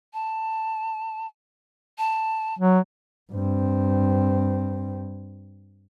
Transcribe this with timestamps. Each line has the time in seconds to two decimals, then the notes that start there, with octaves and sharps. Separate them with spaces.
0.14 A5
1.98 A5
2.59 F#3
3.33 G2 C4